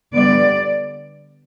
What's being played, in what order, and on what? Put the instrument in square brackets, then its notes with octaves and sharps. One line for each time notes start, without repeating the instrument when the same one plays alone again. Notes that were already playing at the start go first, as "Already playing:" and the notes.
[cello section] D3 G3 B3 D5